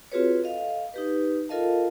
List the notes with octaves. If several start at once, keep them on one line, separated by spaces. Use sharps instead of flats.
C4 F4 F#4 G#4 B4 C#5
A4 D#5 F5
D#4 G4 B4
F4 A4 A#4 D#5 F5 A5